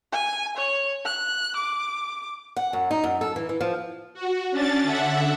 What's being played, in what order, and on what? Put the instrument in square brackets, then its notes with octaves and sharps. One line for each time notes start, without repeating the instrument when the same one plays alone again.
[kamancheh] G#5
C#5
F#6
D6
[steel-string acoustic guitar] F#5
F#2
D#4
F#2
A4
E3
E3
F3
[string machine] F#4
C#4 D4 A6
D3 E5 F#5